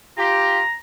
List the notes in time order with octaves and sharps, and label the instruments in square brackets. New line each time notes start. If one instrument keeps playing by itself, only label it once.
[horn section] F4 G4 [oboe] A#5